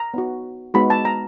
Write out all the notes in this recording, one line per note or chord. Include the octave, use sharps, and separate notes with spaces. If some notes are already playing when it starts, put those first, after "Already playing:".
Already playing: A#5
B3 D#4 F#4
G#3 B3 D#4 F#4 B5
A5
A#5